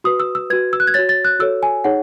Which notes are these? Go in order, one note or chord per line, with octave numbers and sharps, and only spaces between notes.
F#4 B4 D#6
E6
E6
F#4 B4 G#6
E6
F#6
G#6
F#4 C#5 A6
A6
F#6
F#4 A4 C#5 E6
G#5
D#4 G#4 C#5 F#5